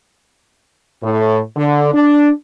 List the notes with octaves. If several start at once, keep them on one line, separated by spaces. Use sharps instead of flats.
A2
D3
D4